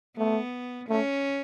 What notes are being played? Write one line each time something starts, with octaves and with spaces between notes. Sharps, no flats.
A3 B3
A3 C#4